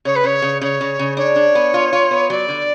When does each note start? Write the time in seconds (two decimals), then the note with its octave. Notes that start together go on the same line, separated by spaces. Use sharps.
0.05 C#3 C#5
0.15 B4
0.24 C#3 C#5
0.42 C#3
0.61 C#3 C#5
0.81 C#3
0.99 C#3
1.17 D4 C#5
1.36 D4
1.55 B3
1.74 F4
1.93 F4
2.11 B3
2.30 F#3 D5
2.49 D3